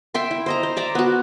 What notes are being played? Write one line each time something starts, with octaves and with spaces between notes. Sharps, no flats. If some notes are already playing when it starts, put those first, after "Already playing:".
E5 G5 C6
E4
C5 D#5 A#5
C5
D5 E5 A#5
B3 F#4